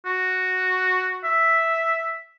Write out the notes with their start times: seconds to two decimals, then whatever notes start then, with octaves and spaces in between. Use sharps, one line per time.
0.06 F#4
1.24 E5